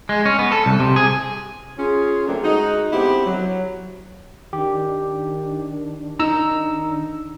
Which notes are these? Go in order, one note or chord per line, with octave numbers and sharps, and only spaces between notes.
G#3
C#4
B3
A4
C2
C3
G#4
C#4 F4 G#4
D3 F#3 A3 A#3 C4 D4
G#3 D#4 F#4
D3 B3 C4 E4 G4
F#3
D#3 D4 G4
D#4 A#5 E6